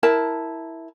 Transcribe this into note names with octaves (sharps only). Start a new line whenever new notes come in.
E4 A#4 A5